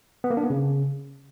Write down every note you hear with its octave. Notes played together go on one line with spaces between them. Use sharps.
B3
A#3
D4
B3
C#3